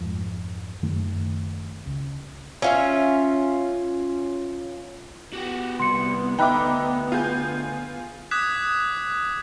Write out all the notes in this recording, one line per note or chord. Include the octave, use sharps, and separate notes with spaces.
F2 G#2
F#1 F#2 D#3 A3
C#2
C#4 F4 E5
B3 F#4 G4
C2 C6 C#7
D2 D#4 E5 G5 B5 D6 F#6
F4 G#4 G6
D6 D#6 F#6 G#6 B6 E7